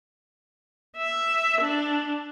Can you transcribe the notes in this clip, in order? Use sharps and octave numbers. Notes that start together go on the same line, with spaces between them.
E5
D4